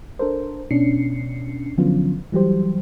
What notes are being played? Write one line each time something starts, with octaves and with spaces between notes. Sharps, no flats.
D4 A4 A#4 C5
B2 C#4 D4 C7 C#7
D3 F3 F#3 B3 C#4 F4
E3 F#3 G3 G4 C5